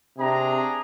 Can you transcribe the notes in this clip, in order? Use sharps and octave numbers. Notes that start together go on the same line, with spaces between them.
C3 D4 G#4 A#5